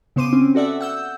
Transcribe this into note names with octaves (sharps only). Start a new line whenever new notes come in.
C#3 B3 C5 C6 D6 D#7
C4 C#4
F#4 A4 D5 E5 F#5
F#5 E6 G6